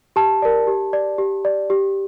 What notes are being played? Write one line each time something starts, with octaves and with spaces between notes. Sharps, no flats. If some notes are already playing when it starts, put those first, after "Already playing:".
G4 A5
A#4 D5
G4
D5
G4
D5
G4